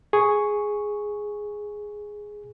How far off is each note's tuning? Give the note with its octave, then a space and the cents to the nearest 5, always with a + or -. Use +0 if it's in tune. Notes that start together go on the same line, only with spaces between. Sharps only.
G#4 +0 C#6 +0